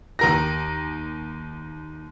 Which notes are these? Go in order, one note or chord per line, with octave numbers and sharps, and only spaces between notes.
D#2 A#4 A#6